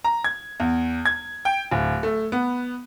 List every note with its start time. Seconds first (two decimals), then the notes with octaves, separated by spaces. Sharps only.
0.05 A#5
0.24 G#6
0.60 E2
1.06 G#6
1.45 G5
1.71 D1
2.03 A3
2.32 B3